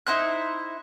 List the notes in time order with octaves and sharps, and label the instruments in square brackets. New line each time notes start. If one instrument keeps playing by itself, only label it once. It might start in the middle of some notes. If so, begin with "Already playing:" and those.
[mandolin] D#4 E4 C5 F#6